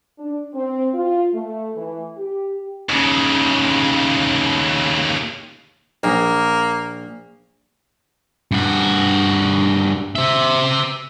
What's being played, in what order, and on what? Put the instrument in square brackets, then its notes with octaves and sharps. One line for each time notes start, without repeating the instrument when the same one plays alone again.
[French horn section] D4
C4
F4
A3
E3
G4
[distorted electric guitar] D#2 C#3
[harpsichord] A#1 [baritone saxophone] A#3
[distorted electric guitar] G2 F#4
C5 E5